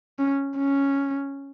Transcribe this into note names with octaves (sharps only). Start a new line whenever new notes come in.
C#4
C#4